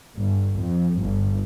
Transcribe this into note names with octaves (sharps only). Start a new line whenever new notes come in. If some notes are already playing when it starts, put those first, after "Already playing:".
G1
F2
G1